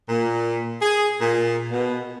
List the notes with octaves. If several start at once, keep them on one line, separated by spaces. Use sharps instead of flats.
A#2
G#4
A#2
B2